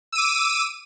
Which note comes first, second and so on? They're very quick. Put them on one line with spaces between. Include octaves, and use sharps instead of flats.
E6 D#7 D6